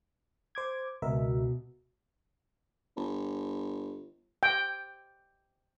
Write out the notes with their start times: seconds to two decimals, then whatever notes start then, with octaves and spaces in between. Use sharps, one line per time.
0.55 C5 D6 G#6
1.02 C#2 B2 A#4 E5
2.96 G1
4.43 G5